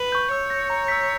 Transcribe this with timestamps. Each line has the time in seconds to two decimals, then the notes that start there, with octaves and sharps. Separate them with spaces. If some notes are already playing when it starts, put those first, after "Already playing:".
Already playing: B4
0.12 C#6 G6
0.31 C#5 E6
0.50 G6 A#6 C#7
0.70 A#5
0.88 E6 G6 B6